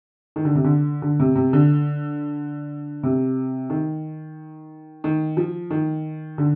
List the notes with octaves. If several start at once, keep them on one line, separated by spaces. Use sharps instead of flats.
D#3
D3
C3
D3
D3
C3
C3
D3
C3
D#3
D#3
F3
D#3
D3